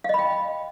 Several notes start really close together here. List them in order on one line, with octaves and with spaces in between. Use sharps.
F5 D#5 B5 G5